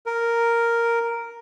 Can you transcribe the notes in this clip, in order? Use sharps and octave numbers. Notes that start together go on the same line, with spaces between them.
A#4